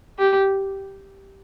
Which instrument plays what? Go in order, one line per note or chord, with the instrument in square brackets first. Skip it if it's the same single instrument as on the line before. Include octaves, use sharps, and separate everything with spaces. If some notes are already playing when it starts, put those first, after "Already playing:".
[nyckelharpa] G4